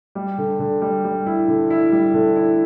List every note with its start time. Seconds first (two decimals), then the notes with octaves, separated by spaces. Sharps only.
0.15 G3
0.38 D3
0.60 D3
0.81 G3
1.04 G3
1.26 E4
1.48 D3
1.70 E4
1.92 G3
2.14 D3
2.36 E4